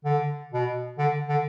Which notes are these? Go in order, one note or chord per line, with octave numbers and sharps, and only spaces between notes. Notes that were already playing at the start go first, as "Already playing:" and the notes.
D3
B2
D3
D3